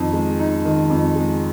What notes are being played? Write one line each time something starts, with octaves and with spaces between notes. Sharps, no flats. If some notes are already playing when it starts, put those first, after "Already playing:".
Already playing: F2 D#3 D#4
G#3
D#4
D#3
F2
G#3